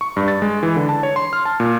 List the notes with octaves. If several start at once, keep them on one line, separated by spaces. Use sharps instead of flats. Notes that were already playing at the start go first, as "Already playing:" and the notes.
C#6
G2
A6
G#3
E3
D3
A5
C#5
C6
F6
A5
A#2